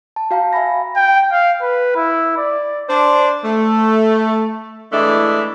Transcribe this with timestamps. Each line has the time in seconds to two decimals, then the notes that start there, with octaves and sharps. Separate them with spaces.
0.16 A5
0.31 F#4 F5 G5 A#5
0.53 E5 F5 G#5 B5 A#6
0.96 G5
1.32 F5
1.62 B4
1.96 E4
2.37 D5
2.89 D4 C5
3.44 A3
4.92 E3 G#3 A3 D4 E4